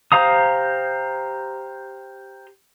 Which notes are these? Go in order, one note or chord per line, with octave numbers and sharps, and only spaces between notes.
G4 C5 F5 A#5 D#6